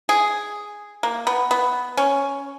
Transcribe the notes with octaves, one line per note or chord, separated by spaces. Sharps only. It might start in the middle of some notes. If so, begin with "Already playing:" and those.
G#4
A#3
B3
B3
C#4